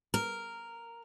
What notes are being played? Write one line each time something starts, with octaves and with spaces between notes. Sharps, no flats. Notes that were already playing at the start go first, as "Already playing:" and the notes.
A#4